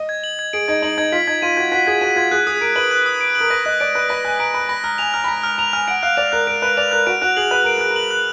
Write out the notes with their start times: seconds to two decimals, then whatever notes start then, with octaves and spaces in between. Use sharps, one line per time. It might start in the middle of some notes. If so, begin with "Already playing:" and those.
Already playing: D#5
0.09 G#6
0.24 F#7
0.39 G#6
0.53 G#4 D7
0.68 D#4 G#6
0.82 D#4 F#7
0.98 D#4 G#6
1.12 F4 B6
1.27 D#4 G#6
1.42 F4 D#7
1.57 F#4 G#6
1.72 F#4 B6
1.87 G#4 G#6
2.01 F#4 D#7
2.16 F4 G#6
2.31 G#4 F#6
2.47 G#4 D#6
2.61 A#4 D7
2.76 B4 F#7
2.91 F#6
3.06 D#6
3.21 D7
3.35 F#7
3.40 A#4
3.50 B4 A#6
3.65 D#5 F#6
3.80 D5 D7
3.95 B4 F#6
4.09 B4 A#6
4.25 G#5 F#6
4.39 A#5 D7
4.54 B5 F#6
4.69 B5 A#6
4.84 A#5 F6
4.98 G#5 F7
5.14 A#5 F6
5.24 B5
5.28 A#5 A#6
5.43 A#5 F6
5.58 A#5 F7
5.73 G#5 F6
5.87 F#5 D7
6.03 F5 F#6
6.17 D5 F7
6.32 A#4 F#6
6.47 A#4 D7
6.62 B4 F#6
6.77 D5 F7
6.92 A#4 F#6
7.07 F#4 D7
7.22 F#4 F#6
7.37 G#4 F#7
7.51 B4 F#6
7.64 A#4 D7
7.78 G#4 F#6
7.90 A#4
7.96 F#7
8.11 F#6